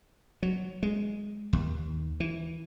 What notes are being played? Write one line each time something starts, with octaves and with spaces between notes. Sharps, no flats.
F#3
G#3
D#2
E3